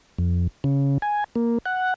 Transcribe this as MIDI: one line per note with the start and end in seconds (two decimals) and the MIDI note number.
0.18 0.47 41
0.64 0.98 49
1.02 1.24 80
1.36 1.58 58
1.66 1.94 78